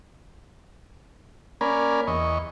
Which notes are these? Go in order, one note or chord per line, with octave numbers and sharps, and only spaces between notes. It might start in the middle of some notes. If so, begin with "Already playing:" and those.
A#3 C#4 A#4 D5 G#5 B5
E2 D#5 C#6